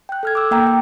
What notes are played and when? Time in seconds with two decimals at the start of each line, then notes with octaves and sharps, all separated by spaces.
0.09 G5 F#6
0.23 A4 F6 G#6
0.35 D6 E6
0.51 A#3 G5 A#5
0.67 G5